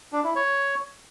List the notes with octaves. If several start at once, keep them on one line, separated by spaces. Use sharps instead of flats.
D4
E4
C#5